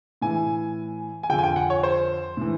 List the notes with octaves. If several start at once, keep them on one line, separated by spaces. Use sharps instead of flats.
A2 E3 G#5
G#5
F2 D3 F3 G5
G#5
G5
F#5
C#5
C5
A2 E3